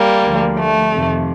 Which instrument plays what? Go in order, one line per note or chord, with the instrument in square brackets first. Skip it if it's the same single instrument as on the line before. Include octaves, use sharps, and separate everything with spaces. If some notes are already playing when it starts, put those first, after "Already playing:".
Already playing: [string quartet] G3 A#3
D2 D3 F3
A3
F2 C3 D#3